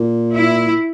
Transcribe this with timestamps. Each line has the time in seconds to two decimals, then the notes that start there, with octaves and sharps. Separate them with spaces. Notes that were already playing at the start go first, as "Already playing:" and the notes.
Already playing: A#2
0.36 E4